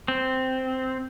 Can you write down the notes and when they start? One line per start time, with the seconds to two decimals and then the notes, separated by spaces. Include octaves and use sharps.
0.08 C4